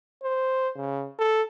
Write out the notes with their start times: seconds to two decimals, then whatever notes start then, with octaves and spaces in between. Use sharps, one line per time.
0.23 C5
0.77 C#3
1.19 A4